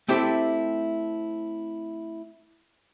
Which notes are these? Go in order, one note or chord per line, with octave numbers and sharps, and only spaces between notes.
A3 C4 E4 G4 A4